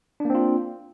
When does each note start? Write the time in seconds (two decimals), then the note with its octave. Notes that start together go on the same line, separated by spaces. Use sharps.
0.20 D4
0.25 A#3
0.30 C4
0.35 F4